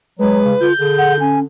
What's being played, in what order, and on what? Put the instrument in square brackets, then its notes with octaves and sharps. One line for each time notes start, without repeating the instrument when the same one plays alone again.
[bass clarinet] F#3 [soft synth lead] G#3 [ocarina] B4
[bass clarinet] C#3
[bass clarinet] D3 [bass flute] F4 [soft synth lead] G6
[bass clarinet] D3 [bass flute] G#4
[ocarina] F#5
[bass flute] C#4 [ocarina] G#5